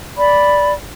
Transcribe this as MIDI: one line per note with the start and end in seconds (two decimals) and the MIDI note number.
0.16 0.71 74
0.16 0.71 83